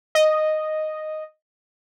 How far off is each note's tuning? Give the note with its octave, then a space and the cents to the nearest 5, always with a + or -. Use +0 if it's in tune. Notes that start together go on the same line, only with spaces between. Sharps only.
D#5 -5